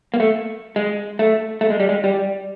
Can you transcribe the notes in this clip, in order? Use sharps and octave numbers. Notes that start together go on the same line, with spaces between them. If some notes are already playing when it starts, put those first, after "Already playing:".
A#3
A3
G#3
A3
A3
G#3
G3
G#3
G3